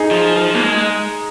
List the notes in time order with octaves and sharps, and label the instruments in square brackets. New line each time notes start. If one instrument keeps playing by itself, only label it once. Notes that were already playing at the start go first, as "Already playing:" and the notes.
Already playing: [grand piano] D#4 G#4
[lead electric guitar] F3
F3
A#3
G#3